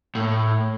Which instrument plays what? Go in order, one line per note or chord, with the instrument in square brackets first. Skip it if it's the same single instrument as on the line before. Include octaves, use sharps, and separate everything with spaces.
[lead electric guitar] A2